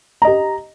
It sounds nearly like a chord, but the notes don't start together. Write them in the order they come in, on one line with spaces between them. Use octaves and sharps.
A#5 D#5 G4